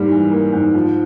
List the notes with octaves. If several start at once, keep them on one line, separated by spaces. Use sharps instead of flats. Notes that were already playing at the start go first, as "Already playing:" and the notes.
Already playing: G#2 E3 G3 A#3
E3
A#3
G#2
F3